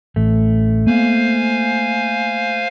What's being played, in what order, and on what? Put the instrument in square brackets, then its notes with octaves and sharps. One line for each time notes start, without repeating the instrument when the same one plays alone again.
[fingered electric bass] A1 [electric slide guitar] A3
[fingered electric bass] A#3 B3 [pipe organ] C5 F5 G#5